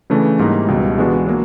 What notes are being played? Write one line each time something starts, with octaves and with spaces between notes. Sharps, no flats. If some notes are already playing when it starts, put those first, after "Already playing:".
C#3 E3 A3 D4
G#2 E3 G3 A#3 D#4
C#2 B2 G3
E3 G#3 B3 D4 F#4
F#3 A#3